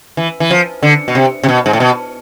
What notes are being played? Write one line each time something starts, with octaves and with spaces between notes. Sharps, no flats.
E3
E3
F3
D3
B2
C3
C3
B2
G#2
A2
B2